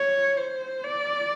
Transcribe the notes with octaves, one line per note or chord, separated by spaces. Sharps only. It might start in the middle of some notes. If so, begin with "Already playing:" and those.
Already playing: C#5
C5
D5